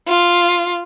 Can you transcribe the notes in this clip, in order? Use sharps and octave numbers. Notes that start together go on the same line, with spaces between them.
F4